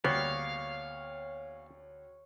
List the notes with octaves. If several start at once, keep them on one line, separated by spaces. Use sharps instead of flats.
D2 G3 A#3 B3 C#5 F5 G5